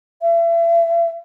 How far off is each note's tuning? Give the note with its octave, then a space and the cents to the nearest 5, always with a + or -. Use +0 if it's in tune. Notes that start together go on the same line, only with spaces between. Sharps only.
E5 +35